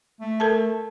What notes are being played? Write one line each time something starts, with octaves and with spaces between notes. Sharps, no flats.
A3
A4 A#4 A5